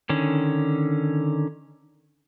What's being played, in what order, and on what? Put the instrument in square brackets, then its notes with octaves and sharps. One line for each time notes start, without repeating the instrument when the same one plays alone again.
[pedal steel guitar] D3 D#3 C#4